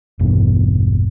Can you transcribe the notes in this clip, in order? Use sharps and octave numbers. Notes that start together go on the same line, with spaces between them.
A1 E2 G2 B2